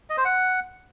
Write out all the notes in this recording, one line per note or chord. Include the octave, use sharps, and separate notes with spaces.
D#5
C5
F#5